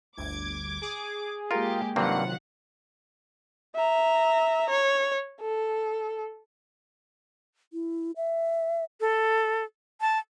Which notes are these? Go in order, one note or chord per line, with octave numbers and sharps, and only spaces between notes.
G1 D2 D6 G#6
G#4
G#3 A#3 F4 G4 A#4
G2 C3 D#3 F#3 A#3 C4 F4 F#5
E5 A#5
C#5
A4
E4
E5
A4
A5